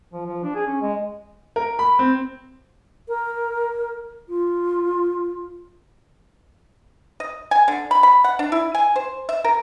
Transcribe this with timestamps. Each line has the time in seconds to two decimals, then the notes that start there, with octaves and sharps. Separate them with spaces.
0.13 F3
0.26 F3
0.43 D4
0.55 G#4
0.67 C#4
0.82 G#3
1.56 A#4
1.79 B5
1.99 C4
3.09 A#4
4.29 F4
7.20 D#5
7.51 G#5
7.68 D3
7.91 B5
8.03 B5
8.24 F#5
8.39 D4
8.52 E4
8.75 G#5
8.96 C5
9.29 E5
9.44 A#4